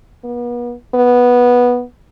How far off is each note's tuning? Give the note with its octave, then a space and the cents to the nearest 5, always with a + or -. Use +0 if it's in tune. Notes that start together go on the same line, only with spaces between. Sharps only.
B3 -40
B3 -10